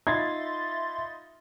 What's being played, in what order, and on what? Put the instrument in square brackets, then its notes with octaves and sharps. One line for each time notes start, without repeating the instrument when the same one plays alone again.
[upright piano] D#4 F4 B5 [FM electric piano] E5 C6 A6 [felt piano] G#6